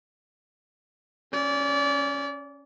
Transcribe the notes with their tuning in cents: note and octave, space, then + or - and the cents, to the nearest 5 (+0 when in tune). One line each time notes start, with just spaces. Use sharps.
C#4 +0 D5 -30